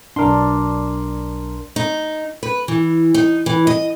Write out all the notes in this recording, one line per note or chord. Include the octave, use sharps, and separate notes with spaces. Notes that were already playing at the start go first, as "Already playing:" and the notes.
B1 D4 A#4 C6
D#4
B4
E3
D#4
E3
D#5